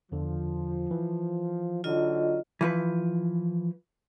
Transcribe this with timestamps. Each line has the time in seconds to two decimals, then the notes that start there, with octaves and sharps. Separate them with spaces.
0.12 E2 D3 F3
0.91 E3
1.84 D3 F#3 D#4 F4 D#5
2.61 E3 F3 B4